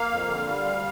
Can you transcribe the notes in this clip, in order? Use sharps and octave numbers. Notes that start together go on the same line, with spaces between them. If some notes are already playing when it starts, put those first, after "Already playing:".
Already playing: A#3 F5
F2
D3
G3
D2